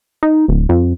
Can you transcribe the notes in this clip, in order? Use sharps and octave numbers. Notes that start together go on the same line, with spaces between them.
D#4
D1
F2